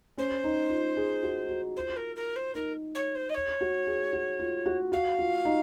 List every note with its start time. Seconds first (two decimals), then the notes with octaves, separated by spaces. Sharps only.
0.18 C#4 C5
0.44 D#4
0.70 F4
0.97 G#4
1.23 F#4
1.49 F#4
1.76 F4 C5
1.96 A#4
2.15 A#4
2.35 C5
2.54 D#4 A#4
2.94 C#5
3.15 C5
3.29 D#5
3.34 C#5
3.61 F#4
3.87 G#4
4.13 F#4
4.39 F4
4.66 F#4
4.92 F#4 F5
5.19 F4
5.45 D#4